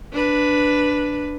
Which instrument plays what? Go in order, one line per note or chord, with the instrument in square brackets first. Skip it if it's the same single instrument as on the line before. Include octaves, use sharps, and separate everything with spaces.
[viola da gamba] D4 B4